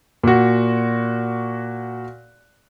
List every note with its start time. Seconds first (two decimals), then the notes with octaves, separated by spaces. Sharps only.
0.24 A#2 F#4